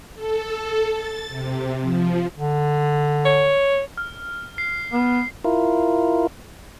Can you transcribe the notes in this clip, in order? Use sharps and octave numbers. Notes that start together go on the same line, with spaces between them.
A4
A6
C3
F3
D3
C#5
F6
C7
B3
E4 F4 A#4